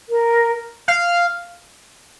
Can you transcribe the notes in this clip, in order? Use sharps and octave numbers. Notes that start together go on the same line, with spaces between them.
A#4
F5